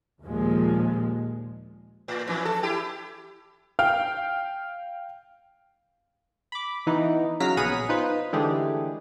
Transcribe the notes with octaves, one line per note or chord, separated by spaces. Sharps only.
D#2 A#2 F3 G#3
A2
F2 E3
A4
E4 G4
F5 G5 F6
B5 D6
E3 B3 D#4 E4
C#3 F#3 F5 A#5 F6 B6
A#1 B3 G#4 F#5 B6 D#7
D#4 F4 B4 C5
D3 E3 G#3 A3 G4 G#4